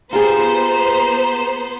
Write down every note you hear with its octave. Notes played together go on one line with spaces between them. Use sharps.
B3 F4 G4 G#4 B4 C5 A#5